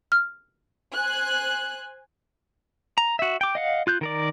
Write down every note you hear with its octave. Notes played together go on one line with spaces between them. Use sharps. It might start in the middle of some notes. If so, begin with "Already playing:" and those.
F6
C5 G#5 F#6
A#5
F#4 E5
G5 D6
D#5 F5 F#5
F4 F#6 G6
D#3 A#4 D5